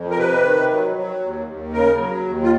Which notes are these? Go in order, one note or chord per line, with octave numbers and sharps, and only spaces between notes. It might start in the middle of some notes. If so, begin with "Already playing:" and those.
Already playing: F2
A#4
C3 B4
D#3
F#3
F#3
D#2
D#2
C#3 A#4
F#3
D#2
F4